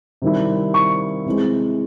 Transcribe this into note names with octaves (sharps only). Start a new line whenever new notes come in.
C3 D#3 G3 C4 E4
C#6
C3 E3 G#3